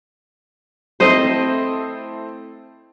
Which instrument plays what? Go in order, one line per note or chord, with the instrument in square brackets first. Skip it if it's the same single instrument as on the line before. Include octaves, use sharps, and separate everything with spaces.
[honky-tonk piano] A3 C4 E4 [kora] C5 D#5